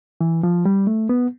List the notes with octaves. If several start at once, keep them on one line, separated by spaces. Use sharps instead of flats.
E3
F3
G3
A3
B3